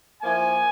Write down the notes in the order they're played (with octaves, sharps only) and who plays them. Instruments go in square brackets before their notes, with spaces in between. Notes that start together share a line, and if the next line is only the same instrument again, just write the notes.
[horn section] F3 A#3 E4 G#5